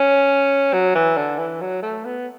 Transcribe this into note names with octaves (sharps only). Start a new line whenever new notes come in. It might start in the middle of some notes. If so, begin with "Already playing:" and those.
Already playing: C#4
F#3
E3
D3
E3
F#3
A3
B3